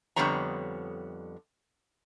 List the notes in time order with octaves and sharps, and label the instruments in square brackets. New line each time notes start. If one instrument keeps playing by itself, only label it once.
[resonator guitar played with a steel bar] F2 D3 G3 B3 C#5 A#5